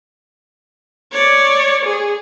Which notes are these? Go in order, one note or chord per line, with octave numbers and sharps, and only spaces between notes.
C#5 D5
G#4